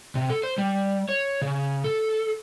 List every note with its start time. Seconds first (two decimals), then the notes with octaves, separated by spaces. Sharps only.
0.15 C3
0.30 A4
0.43 C5
0.58 G3
1.09 C#5
1.42 C#3
1.84 A4